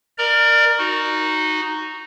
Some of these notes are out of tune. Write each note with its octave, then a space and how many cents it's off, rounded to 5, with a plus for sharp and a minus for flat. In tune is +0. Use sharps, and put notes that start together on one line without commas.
A#4 +0 D5 +30 A#5 +0
D#4 +0 F#4 +0